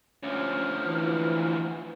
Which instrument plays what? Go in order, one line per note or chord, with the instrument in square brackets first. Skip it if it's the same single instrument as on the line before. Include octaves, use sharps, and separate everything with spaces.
[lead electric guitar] D2 F3 [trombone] C#4
[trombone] E3